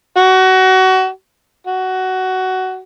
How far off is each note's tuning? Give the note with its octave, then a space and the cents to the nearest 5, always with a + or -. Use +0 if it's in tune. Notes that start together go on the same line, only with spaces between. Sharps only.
F#4 +25
F#4 +15